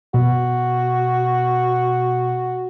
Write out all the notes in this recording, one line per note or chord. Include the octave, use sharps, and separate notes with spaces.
B2 F#4